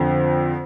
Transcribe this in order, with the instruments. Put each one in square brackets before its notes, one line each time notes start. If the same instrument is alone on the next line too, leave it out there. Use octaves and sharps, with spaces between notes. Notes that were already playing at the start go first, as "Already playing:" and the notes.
Already playing: [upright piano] F2 D3 F3 C4